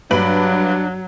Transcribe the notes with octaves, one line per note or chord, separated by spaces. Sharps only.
G2 F#3 D4 B4 F#7